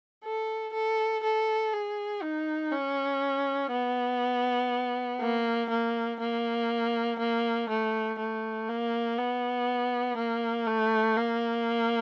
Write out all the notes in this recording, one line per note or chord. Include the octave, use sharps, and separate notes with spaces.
A4
A4
A4
G#4
D#4
C#4
B3
A#3
A#3
A#3
A#3
A3
A3
A#3
B3
A#3
A3
A#3